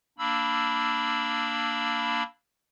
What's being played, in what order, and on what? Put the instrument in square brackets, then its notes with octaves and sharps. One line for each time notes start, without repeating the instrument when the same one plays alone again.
[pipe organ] A#3 D4 B5 E6